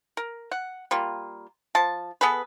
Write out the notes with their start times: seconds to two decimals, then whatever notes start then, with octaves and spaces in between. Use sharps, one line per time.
0.17 A#4
0.51 F#5
0.91 G3 A#3 F4
1.75 F3 A5
2.21 B3 G#4 A4 B4